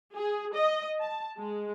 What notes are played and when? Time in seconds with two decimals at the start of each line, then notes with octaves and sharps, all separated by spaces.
0.15 G#4
0.55 D#5
1.01 A5
1.38 G#3